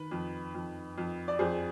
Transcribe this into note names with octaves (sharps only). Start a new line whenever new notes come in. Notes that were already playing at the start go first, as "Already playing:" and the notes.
Already playing: D#3 B4
F2
F2
F2
D5
F2 G#4 C5